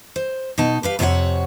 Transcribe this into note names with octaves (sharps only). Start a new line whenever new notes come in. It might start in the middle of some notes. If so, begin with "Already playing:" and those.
C5
B2 D#4 A5
G4 B4 F5
F2 C3 F#4 G#4 C#5 F#5